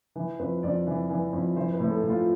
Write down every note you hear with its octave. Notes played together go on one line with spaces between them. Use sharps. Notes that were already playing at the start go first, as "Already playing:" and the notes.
E3
F2 B4
F2 D5
E3
E3
F2
E3 C5
B4
A2
A4
A2
F4